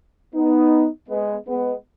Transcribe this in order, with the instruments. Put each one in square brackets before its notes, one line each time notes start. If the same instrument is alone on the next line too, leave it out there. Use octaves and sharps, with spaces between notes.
[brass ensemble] B3 D#4
G#3 B3
G#3 B3